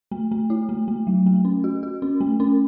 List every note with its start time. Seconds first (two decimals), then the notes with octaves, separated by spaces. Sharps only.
0.11 A3
0.32 A3
0.50 E4
0.69 A3
0.88 A3
1.07 F#3
1.26 A3
1.45 C#4
1.64 F#4
1.83 F#4
2.02 C#4
2.21 A3
2.40 C#4